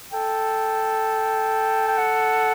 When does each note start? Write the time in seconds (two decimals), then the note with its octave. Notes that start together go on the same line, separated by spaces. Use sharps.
0.12 A4 G5
1.88 G5
1.97 F#5